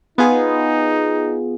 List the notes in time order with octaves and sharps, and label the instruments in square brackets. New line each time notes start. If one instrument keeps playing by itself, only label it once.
[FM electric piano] B3 F4 G#4 [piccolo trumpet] D#4